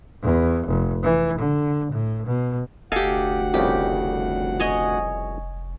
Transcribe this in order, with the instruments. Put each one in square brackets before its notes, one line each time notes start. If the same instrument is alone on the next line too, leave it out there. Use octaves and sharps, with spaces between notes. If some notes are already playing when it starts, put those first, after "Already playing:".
[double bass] E2
F1
E3
D3
A2
B2
[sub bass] F1 [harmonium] D2 F#5 [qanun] G4 F5 [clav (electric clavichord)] A4 D#5 G#5
[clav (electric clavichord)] C2 F2 C#3 [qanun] G4
[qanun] C#5 D#5 G#5